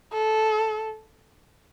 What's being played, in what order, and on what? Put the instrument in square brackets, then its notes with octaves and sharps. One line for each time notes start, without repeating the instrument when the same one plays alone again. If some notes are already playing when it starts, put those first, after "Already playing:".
[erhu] A4